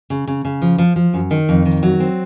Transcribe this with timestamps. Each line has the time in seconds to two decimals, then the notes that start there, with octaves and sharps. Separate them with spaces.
0.10 C#3
0.27 C#3
0.45 C#3
0.62 F3
0.78 F3
0.96 F3
1.14 F#2
1.31 D#3
1.49 F2
1.66 D#3
1.83 F#3
2.00 C4